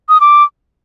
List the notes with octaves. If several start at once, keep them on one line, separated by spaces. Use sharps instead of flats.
D#6
D6